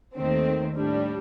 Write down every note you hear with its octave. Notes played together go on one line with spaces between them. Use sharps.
D#2 D#3 A3 C4
A2 G3 D4